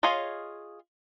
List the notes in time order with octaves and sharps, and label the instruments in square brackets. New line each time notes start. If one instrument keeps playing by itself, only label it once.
[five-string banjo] F4 G#4 C#5 D#5 F5